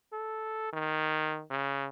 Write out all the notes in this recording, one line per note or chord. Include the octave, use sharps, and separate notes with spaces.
A4
D#3
C#3